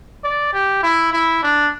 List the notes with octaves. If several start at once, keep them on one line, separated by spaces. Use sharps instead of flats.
D5
G4
E4
E4
D4